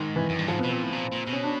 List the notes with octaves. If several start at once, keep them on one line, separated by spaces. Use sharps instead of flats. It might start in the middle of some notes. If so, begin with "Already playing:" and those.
Already playing: G#2 D#3
E3
F#2
G2
G#2 F3
B3
B2
A#2 C4
A2
A#2
A#2
B2
C#4
D4